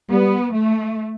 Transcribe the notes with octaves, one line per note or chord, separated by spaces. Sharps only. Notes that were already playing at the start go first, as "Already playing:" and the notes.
G3 B3
A3